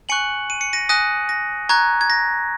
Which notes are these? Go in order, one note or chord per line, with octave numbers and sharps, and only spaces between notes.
G#5 C#6 F#6 C#7 F#7
D#7
C#7
A#6 D#7
G#5 D#6 F#6 A#6 D#7
A#6
A#5 C#6 F#6 G#6
G#6
A#6